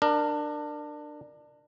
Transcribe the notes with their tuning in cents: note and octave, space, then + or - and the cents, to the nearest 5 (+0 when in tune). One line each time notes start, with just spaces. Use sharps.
D4 +20 A#4 +0